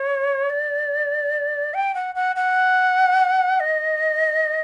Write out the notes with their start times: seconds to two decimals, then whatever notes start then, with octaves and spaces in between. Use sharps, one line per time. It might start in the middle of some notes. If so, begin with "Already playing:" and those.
Already playing: C#5
0.50 D5
1.74 G5
1.95 F#5
2.15 F#5
2.36 F#5
3.60 D#5